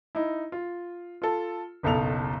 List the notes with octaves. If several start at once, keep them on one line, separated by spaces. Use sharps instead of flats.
D#4 E4
F4
F4 A4
F#1 B1 B2 A4 F7